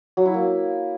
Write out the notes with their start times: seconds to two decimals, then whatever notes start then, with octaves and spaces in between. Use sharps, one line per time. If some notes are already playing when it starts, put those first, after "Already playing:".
0.17 F#3
0.25 E4
0.34 A#3